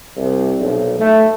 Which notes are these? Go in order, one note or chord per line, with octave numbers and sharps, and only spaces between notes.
C2
B1
A3